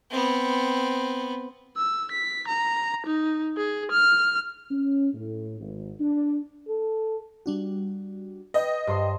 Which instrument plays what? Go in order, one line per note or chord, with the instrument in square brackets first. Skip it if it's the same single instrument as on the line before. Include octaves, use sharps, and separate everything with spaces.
[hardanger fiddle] B3 C4
[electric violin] E6
B6
A#5
D#4
G#4
F6
[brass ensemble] C#4
A2
G#1
D4
[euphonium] A4
[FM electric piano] G3 D4 F#4
[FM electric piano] B4 G5 [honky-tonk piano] D#5
[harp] G2 C5 C6